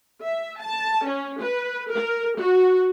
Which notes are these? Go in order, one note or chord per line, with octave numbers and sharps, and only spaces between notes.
E5
A5
C#4
B4
A#4
F#4